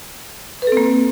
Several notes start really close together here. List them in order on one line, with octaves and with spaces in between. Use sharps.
B4 A4 C4 A#3